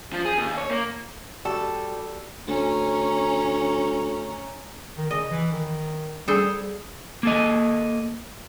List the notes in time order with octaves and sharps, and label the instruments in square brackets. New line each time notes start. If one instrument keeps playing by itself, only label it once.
[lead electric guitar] F3
G#4
D#2
C#5
A#3
[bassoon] G3 [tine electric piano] F#4 [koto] A4
[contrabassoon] D2 [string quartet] C#4 A#5
[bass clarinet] D#3
[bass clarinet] C#3 [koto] D#5
[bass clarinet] E3
D#3
[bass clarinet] G3 [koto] G#4 A4 C5
[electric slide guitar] A#3 A4 D#5